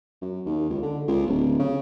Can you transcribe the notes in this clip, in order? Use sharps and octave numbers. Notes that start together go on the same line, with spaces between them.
F#2
D#2
C#2
D3
C#2
D1
C#3